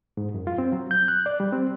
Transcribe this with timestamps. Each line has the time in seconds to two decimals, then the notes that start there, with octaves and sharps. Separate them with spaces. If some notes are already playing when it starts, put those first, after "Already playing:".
0.17 G#2
0.34 F#2
0.47 F4
0.58 C4
0.72 F#3
0.91 G6
1.08 F#6
1.26 D5
1.40 G3
1.53 C4